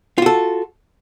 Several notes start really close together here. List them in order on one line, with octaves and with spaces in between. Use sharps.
F4 F#4 A4